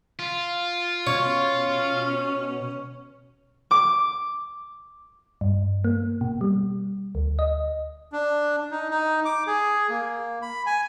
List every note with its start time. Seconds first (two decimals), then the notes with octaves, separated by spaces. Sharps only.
0.19 F4
1.07 B2 C#4 C#5
1.66 B2
3.71 D6
5.41 G2
5.84 A#3
6.21 B2
6.41 G3
7.15 D2
7.39 D#5
8.12 D4
8.71 D#4
8.91 D#4
9.25 D6
9.47 G#4
9.89 A#3
10.42 B5
10.66 G#5